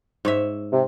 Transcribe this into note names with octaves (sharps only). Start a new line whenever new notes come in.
G#2 C#5 E5
C3